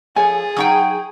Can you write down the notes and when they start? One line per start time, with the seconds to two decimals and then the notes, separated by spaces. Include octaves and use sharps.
0.16 F3 G#4 A4 C#5 G#5
0.57 F#3 D#4 F#5 G5 C#6 D#6